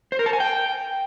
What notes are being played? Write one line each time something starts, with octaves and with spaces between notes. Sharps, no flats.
C5
A#4
A5
G#5
G5